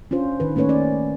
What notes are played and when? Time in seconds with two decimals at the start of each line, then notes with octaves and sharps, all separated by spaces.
0.11 C#4 D4 F4 C5
0.40 D#3 B4
0.56 A3 A#3 C#4 B4 C#5
0.69 C#4 D5